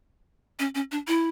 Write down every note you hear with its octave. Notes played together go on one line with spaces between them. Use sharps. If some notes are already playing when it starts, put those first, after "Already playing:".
C#4
C#4
D4
E4